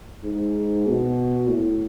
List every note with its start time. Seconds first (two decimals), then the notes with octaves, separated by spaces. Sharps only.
0.24 G#2
0.87 B2
1.49 A2